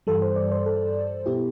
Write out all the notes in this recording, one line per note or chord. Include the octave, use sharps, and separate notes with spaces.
G2 E3 G3 A4
C5
D5
C5
A4
B2 B3 E4 G4